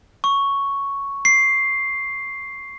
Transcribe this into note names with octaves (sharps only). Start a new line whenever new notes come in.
C#6
C7